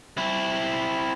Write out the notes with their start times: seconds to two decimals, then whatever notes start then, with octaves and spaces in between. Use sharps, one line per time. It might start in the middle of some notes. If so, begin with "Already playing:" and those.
0.17 C4 E4